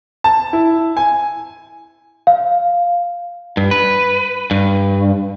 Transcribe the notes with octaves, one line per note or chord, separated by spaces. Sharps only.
A5
E4
G#5
F5
G2
B4
G2